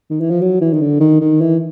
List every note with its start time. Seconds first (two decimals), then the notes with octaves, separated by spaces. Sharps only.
0.10 D#3
0.20 E3
0.30 F3
0.41 F#3
0.61 E3
0.73 D#3
0.81 D3
1.00 D#3
1.21 D#3
1.41 E3